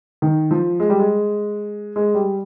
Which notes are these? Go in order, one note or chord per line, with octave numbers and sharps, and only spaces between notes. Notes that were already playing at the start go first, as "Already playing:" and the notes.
D#3
F3
G#3
G3
G#3
G#3
G3